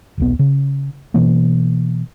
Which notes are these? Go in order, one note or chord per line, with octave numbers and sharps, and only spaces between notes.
D#1 B1 B3
C#3
B2 E3 A#3